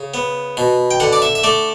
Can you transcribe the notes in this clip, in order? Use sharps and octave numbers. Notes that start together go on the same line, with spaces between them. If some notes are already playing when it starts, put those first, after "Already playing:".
Already playing: C#3
B3
B2
G5
D3 F#5
D5
E5
E5
A3 D5